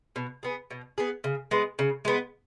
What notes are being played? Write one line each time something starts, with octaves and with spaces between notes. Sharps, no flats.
B2
B3 G#4
B2
B3 G#4
C#3
G#3 B3
C#3
G#3 B3